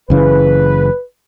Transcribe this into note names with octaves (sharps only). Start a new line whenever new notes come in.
F#1 C#3 E3 B4